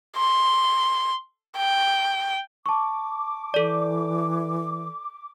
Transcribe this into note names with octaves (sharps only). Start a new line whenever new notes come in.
C6
G5
A5 C#6 D6
E3 A4 D5